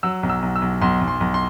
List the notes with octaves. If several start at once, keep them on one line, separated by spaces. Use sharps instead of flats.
F#3 E6
B1
E6
B1
E6
B1
B1 C6
B1
C6
B1
C6